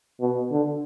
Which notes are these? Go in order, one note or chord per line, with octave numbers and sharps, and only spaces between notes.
B2
D3